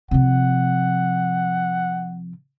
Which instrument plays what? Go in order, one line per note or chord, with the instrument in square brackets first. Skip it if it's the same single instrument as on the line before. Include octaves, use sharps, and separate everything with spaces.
[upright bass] C3 F3 [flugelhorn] F#5